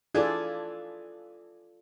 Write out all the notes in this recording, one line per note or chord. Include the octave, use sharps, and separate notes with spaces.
E3 D4 F4 G#4 A4 D5